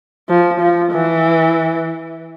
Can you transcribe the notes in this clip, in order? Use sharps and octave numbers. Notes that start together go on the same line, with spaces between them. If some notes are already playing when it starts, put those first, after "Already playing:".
F3
F3
E3